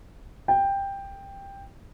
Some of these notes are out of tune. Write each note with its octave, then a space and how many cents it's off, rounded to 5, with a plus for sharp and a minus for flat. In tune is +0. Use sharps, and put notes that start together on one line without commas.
G5 +10